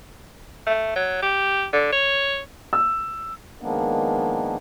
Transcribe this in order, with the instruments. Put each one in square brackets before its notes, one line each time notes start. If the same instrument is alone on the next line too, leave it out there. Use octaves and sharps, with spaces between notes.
[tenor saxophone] A3
F#3
G4
D3
C#5
[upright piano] E6
[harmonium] D#3 F3 G#3 A#3 B3 D4